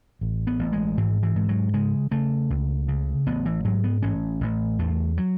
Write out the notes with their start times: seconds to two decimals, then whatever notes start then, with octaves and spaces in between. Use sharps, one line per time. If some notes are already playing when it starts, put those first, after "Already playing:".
0.21 A1
0.47 B3
0.59 A1
0.73 G#3
0.97 G#2 E3
1.23 E3
1.36 G#2
1.49 F#3
1.74 C#3 G#3
2.11 C#3 A3
2.50 C#2
2.88 C#3
3.26 A1 B3
3.46 E3
3.64 G#2 F#3
3.84 B3
4.03 A1 C#4
4.41 A1
4.79 E2 A3
5.18 F#3